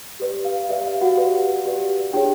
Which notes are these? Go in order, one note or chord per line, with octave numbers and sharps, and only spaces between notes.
G4 B4 D5
F5
G4 B4 D5 E5
F5
F#4 F#5
G4 B4 D5
G4 B4 D5
D4 F4 G4 G#4 C#5 G5